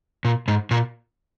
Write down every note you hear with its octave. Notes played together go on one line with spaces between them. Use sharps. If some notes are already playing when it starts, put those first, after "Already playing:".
A#2
G#2
A#2